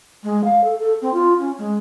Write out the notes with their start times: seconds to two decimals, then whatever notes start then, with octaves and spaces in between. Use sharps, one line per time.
0.23 G#3
0.44 F5
0.63 A4
0.78 A4
1.01 C4
1.13 F4
1.39 C#4
1.58 G#3